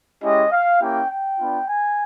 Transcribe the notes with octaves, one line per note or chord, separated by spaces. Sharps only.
G#3 C#4 E4 G4 D#5
F5
A#3 C#4 E4 G4 G5
G5
B3 D4 F4
G#5